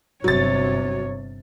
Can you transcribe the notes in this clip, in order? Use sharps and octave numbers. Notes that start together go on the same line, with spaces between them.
G1 C3 F#3 C#5 A6